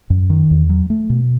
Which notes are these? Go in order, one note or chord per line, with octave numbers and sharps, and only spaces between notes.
F#2
D#3
E2
F#3
A3
B2